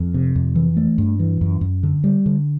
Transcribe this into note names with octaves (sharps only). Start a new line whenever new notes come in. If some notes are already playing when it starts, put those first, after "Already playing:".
Already playing: F2
C3
F2
E3
A3
G2
E3
F#2
F#2
D3
G3
D3